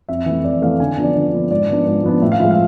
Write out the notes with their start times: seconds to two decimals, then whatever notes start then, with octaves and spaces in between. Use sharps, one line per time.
0.09 F2 E5
0.26 E3 A3
0.44 F2 D5
0.62 E3 A3 F5
0.80 D3 G#5
0.97 F3 B3 D4
1.04 D5
1.15 D3 D5
1.33 F3 B3 D4
1.51 G#2 D5
1.69 F3 B3 D4
1.86 G#2
2.04 F3 B3 D4
2.22 A2 E5
2.32 F5
2.40 F3 G#3 E5
2.51 F5